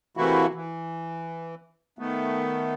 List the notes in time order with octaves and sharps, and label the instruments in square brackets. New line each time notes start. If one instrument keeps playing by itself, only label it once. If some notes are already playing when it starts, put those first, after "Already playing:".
[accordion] C3 E3 A3 A#3 E4 F#4
E3
D#3 A3 B3